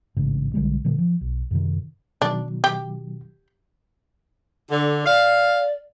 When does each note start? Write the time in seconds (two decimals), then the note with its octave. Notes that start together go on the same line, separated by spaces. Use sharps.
0.17 A1 G#2 C#3
0.54 B1 D3 G3 G#3
0.85 A#2 D3 F#3
0.98 F3
1.21 B1
1.51 F#2 C3 D#3
2.22 B2 D#3 F#3 D4
2.64 G4
4.70 D3
5.06 D5 F5